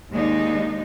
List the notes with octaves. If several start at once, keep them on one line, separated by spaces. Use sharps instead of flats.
D#2 G#3 D4 D#4